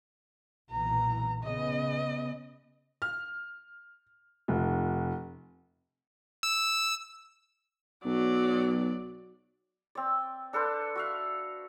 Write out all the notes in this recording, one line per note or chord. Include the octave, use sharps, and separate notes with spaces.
B1 A#2 E3 A#5
C#3 B3 D#5
F6
F1
E6
B1 F#3 D5
C4 D5
D4 A4 B4 C5
F#4 E5 F5